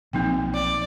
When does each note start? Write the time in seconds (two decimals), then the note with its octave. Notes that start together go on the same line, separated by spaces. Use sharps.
0.13 B1 F3 A#3 C4 D#4 G5
0.54 D5